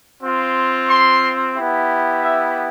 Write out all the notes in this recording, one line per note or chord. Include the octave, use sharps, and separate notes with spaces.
C4 F4
C6
B3 E4 G4
E5